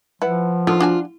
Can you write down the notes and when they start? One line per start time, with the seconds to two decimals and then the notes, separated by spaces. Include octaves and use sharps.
0.22 F3 E4 B4 F#5
0.67 D3 D#3 D4 F4
0.80 D4 F#4 G#5